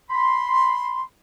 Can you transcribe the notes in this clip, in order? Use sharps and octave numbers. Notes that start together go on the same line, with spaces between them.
B5 C6